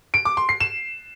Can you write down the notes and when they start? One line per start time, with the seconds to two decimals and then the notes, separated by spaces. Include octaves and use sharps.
0.14 D7
0.25 D6
0.37 C6
0.49 C7
0.60 E7